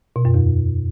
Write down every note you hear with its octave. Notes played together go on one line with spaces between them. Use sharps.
B2
F#2
E2